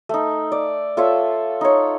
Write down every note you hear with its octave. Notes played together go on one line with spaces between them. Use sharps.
A3 D#4
D5
F4 A4 C#5 E5
D#4 C#5